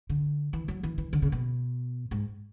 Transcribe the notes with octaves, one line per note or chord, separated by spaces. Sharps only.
D3
E3
F#3
E3
E3
D3
C#3
B2
G#2